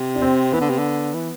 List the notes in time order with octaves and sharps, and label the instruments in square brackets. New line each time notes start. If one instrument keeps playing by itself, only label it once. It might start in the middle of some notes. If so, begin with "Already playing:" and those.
Already playing: [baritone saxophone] C3
[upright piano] D4
C4
[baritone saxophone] E3 [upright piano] B3
[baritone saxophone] D3
C3
D3
E3